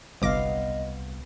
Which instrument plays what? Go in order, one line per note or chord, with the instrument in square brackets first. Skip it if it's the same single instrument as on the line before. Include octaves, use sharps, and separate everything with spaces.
[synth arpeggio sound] G1 D6 A#6 [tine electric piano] C2 [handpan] B3 F5 [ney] D#5